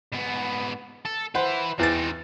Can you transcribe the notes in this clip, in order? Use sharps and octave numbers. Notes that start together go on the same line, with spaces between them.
G#2 B3
A4
E4 B4 C5 F#5
E2 C4 D#4 A6